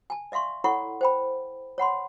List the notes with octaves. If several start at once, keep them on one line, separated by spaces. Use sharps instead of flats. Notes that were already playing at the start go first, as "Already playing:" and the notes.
G#5 A5
D5 E5 F5 C6 C#6
E4 A4 C#5 F#5 B5 C#6
C5 G5 B5
C#5 F#5 B5 C6